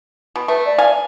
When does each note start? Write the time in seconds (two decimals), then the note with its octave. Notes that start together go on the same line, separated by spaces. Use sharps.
0.36 B2
0.48 A3 B4
0.66 D5
0.78 F5 G#5